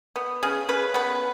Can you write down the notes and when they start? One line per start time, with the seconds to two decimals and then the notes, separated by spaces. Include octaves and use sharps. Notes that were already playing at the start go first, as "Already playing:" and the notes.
0.16 B3
0.43 C#3 G#4
0.69 C#3 B4
0.94 B3 B4